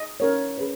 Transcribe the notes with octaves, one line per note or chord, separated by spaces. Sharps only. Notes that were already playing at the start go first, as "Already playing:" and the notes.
Already playing: D#5
C#4 E4 A#4 C#5
C#4 G#4 B4